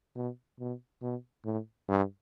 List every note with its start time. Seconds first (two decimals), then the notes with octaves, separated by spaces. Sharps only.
0.16 B2
0.60 B2
1.02 B2
1.45 A2
1.89 G2